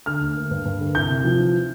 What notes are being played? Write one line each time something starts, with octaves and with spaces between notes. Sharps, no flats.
D3 F6
D2
A#3
G2
G2
D3
C2 G6
C3
F3
E3